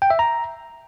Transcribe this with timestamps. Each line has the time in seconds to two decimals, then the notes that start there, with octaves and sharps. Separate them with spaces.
0.02 G5
0.10 E5
0.19 A#5